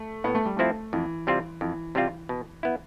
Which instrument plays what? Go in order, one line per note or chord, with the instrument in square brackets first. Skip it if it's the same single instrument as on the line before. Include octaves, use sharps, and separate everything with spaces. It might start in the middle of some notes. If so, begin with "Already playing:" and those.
Already playing: [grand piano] A3
[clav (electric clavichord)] A2 [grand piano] B3
[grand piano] A3
G3
[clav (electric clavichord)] F3 C4 E4 [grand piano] A3
[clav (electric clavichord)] F2 [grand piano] E3
[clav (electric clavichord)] C3 G3 C4 F4
[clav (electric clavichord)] F2 [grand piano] E3
[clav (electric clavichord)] C3 G3 C4 F4
B2
B3 E4